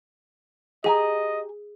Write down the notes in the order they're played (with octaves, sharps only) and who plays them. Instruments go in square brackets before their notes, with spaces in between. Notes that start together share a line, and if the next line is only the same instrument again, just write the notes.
[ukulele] G4 G#5 A#5 [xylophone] G#4 [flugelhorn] D#5